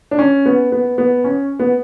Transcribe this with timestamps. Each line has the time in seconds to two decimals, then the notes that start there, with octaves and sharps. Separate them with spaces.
0.11 D4
0.19 C#4
0.46 B3
0.72 B3
0.98 B3
1.24 C#4
1.60 B3